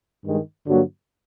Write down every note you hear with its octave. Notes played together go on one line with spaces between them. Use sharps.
G2 D#3 G#3
G2 D3 F#3 A#3